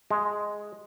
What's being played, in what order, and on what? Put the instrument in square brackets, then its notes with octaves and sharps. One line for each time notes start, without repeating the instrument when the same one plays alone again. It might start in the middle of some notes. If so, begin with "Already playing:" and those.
[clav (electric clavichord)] G#3